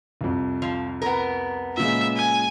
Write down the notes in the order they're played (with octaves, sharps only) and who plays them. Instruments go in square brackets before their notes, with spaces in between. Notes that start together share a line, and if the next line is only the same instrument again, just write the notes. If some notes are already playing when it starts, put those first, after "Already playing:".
[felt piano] C2 F2
[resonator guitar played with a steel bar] F3
B3 A#4
[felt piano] A#2 C#3 G#3 [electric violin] E5
[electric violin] G#5